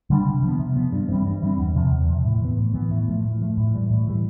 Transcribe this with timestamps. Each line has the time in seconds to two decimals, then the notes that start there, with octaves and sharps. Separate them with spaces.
0.10 D3 G3 D4
0.26 C3
0.43 F3 B3
0.59 C3
0.76 F3 B3
0.92 G2
1.10 E3 G3 C4
1.26 G2
1.42 E3 G3 C4
1.59 E2
1.75 C3 F3
1.91 E2
2.08 C3 F3
2.25 A2
2.42 E3 B3
2.58 A2
2.74 E3 B3
2.91 A2
3.08 F3 A3
3.25 A2
3.41 F3 A3
3.57 A2
3.74 E3 G3
3.90 A2
4.07 E3 G3